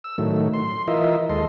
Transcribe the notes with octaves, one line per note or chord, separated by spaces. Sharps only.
E6
A2 D#3 F#3 A3
C6
E3 F4 A#4 D#5 E5
D#2 G#3 A4 D#5 C6